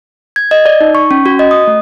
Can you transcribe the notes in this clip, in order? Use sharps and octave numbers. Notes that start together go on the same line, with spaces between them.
G#6
D#5
D5
D#4
C#6
C#4
F#4
D#5
D#6
A3